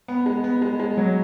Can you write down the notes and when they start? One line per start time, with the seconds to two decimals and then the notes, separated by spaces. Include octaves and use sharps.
0.08 B3
0.26 G#3
0.44 B3
0.62 G#3
0.80 G#3
0.97 F#3